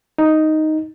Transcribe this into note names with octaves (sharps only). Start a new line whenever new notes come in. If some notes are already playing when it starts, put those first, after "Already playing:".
D#4